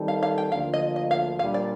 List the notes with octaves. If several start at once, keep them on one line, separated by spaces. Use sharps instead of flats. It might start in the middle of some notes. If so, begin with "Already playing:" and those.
Already playing: D#3 G3 C4 D#4 A4
F5
F5
G5
D2 D3 F3 A#3 F4 F5
D#5
D#5
F5
A#2 G3 D4 F5
D5